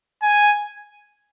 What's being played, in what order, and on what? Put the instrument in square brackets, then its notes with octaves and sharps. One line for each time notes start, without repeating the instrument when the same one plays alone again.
[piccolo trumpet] G#5